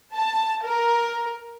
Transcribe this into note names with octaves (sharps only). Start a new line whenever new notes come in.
A5
A#4